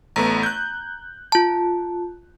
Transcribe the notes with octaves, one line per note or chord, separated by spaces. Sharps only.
A1 A3 B3 A#5
F#6 G6
F4 A5